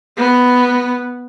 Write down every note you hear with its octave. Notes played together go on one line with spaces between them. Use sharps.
B3